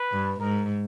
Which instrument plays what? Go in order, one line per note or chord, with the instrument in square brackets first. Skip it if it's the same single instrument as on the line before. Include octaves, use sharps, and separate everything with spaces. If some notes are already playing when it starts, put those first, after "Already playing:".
Already playing: [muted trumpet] B4
[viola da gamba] G2
[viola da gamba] G#2 [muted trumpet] A#4